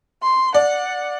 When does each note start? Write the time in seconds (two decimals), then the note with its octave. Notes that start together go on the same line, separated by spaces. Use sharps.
0.23 C6
0.54 D5 F#5